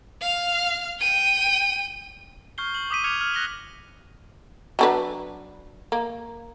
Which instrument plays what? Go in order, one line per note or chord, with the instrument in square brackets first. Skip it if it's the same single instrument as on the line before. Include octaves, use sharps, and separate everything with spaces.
[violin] F5 F6
G5 D#7
[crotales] C#6 F6 G6 C7 G7
F#7
D6 D#6 B6 D#7
D6 F6 G#6 C#7 F7 G7
F6
F#6 A#6 D#7 G7
[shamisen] F#3 D4 B4
A#3